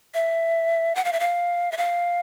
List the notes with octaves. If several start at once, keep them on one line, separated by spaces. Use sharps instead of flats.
E5
F#5
F5
E5
F5
E5
F5